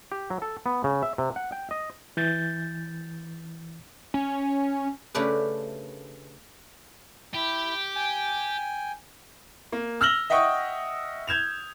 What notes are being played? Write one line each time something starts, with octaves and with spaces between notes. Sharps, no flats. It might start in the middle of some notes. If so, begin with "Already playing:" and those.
G4
F#3
A4
B3
C#3
E5
C3
F#5
G5
D#5
E3 G6 A6
C#4
C#3 A3 D4 G4 A#4 B4
E4 G4
G5 G#5
A#3
E6 F6 A#6 F#7 G7
D#5 E5 F#5 G5 C#6 D#6
G6 G#6 E7 F7